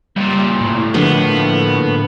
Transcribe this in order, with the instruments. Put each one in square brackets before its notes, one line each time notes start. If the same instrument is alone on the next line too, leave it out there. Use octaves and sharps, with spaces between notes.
[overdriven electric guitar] C#2 A#2 [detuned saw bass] G3
[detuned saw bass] A2
[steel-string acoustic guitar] D3 F3 A#3 [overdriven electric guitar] B3